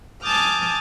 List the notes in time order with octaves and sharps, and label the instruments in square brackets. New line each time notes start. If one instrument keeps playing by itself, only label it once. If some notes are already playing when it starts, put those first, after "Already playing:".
[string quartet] G#5 A5 D6 D#6 F6 G6